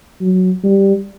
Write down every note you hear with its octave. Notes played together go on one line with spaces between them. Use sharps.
F#3
G3